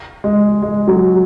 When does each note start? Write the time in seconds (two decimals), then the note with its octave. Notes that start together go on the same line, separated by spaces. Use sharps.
0.24 G#3
0.62 G#3
0.87 F#3